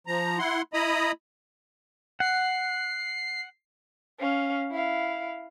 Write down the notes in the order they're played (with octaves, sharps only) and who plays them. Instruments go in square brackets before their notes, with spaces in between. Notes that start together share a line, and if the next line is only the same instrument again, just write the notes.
[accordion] F3 A#5
E4 F#5 C6
E4 D#5 A#5 B5 D#6
[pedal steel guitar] F#5 [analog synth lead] C7
[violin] C#4 F5
E4 F5